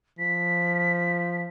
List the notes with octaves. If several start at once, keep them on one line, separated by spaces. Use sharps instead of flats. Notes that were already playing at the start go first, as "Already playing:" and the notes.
F3 B6